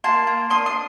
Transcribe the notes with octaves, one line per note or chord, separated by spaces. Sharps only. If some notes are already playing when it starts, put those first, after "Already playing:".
A#3 A5 C6
A#3
D4 C6 D#6
C6 D#6